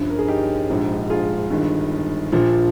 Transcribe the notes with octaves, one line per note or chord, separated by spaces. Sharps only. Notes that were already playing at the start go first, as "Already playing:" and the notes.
Already playing: G1 G2 F3 C#4 F4
A#4
G#4
D#4 G4
A#1 G#2 F3
F4 G#4
G1 G2 D#3
A#1 A#2 F3